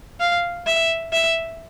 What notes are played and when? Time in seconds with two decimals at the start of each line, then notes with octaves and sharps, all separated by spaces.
0.20 F5
0.66 E5
1.13 E5